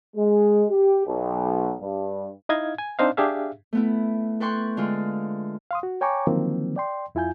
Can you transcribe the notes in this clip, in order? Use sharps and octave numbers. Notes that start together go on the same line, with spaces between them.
G#3
G4
B1
G2
D#4 E4 D#5 F5 G#6
G#5
C4 D4 D#4 C5 D#5 F5
D4 G4 G#4 E5 F5
A3 B3 E4
A4 B4 G5 C6 C#6 F#6
D3 G#3 F4
F5 C6 D#6
F#4
C#5 G5 G#5 A#5 C#6 D6
D3 D#3 F3 F#3 A#3 C4
D5 G5 C6
F2 E4 F4 G#5 G6